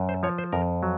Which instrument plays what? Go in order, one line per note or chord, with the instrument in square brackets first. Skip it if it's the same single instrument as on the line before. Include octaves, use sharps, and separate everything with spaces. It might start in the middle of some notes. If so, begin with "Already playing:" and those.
Already playing: [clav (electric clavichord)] F#2
C5
F3 C#5
C5
F2 A#4
F#3